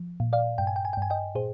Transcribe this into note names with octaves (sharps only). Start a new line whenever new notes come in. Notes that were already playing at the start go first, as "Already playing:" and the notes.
Already playing: F3
A#2
D5 F5
G2 G5
G#5
G5
G#5
G5
G2 G#5
D#5 G5
A#2 G#4 C5